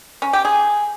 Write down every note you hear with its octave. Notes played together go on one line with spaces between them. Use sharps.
C#4
G4
G#4